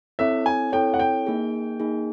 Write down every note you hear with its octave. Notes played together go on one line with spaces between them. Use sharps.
C4 E4 A4 C#5 E5
G#5
C4 E4 A4 C#5 G5
F#5
G5
A#3 D#4 G#4
A#3 D#4 G#4